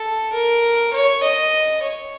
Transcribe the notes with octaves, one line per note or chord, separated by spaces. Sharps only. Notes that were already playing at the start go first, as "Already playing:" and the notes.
Already playing: A4
A#4
C#5
D#5
C#5